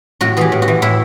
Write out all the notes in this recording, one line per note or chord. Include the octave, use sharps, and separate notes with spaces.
A2 F#4
E3 G4 G#4
A2
F#4
E3
A2 E4